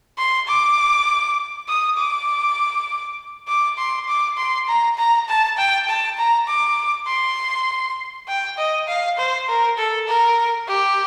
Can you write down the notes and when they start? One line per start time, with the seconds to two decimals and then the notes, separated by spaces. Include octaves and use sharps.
0.18 C6
0.47 D6
1.68 D#6
1.97 D6
3.48 D6
3.78 C6
4.08 D6
4.37 C6
4.68 A#5
4.98 A#5
5.28 A5
5.57 G5
5.88 A5
6.18 A#5
6.47 D6
7.07 C6
8.28 G5
8.58 D#5
8.88 F5
9.17 C5
9.48 A#4
9.78 A4
10.08 A#4
10.68 G4